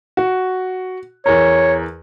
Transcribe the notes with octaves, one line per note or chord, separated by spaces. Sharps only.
F#4
E2 A#4 C#5